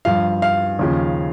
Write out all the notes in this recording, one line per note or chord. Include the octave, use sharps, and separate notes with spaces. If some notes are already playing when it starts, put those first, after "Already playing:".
G2 F3 F5
F5
D#2 C#3 F3